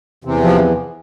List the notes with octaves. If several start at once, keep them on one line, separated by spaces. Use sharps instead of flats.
E2 C3 E3
F3